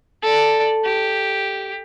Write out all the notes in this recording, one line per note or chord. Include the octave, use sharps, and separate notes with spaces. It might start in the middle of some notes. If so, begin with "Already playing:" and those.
A4 D5
G4